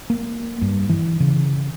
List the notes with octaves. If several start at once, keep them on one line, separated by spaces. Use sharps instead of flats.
A#3
G2
E3
C#3